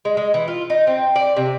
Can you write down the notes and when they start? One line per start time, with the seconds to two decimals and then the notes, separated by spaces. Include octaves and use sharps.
0.05 G#3
0.17 G#3
0.34 E3
0.48 F4
0.70 D#4
0.87 C4
1.16 D5
1.36 C3